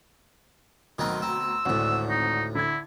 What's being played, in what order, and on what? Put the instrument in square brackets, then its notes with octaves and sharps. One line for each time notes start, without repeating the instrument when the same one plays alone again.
[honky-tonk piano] D2 B2 A#5 [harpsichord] D#3 F#3 C4
[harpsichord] C4 [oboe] E6
[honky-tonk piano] G#1 C4 F#5 [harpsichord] D2 A2
[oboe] D#4
[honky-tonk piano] D3 G#6 [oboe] E4